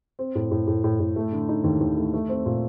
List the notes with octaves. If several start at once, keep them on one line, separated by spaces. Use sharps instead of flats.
C4
A2
A2
A2
A2
A2
A3
D3
D#4
D#2
D#2
A3
A3
C4
A#2